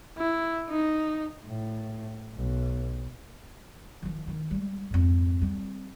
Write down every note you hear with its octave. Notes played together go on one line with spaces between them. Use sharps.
E4
D#4
A2
B1
D#3 F3
D#3 D#4
G3 G#3
F2 G#2
G3 C4